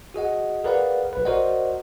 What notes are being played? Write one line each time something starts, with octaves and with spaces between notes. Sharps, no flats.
F#4 G#4 D#5 F#5
G#4 A#4 B4 D5 F5 F#5
A#1 B4
F#4 A#4 C5 D5 D#5 F#5